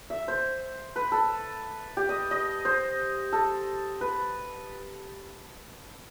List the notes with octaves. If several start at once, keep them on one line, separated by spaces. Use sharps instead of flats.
E5
C5
B4
A4
G4
D#5
D#5
C5
A4
B4